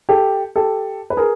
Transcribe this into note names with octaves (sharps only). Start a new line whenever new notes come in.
G4 A4
G4 A4
B4
G#4 A#4